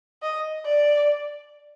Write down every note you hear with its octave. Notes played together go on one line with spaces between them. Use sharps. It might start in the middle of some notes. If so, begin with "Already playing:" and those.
D#5
D5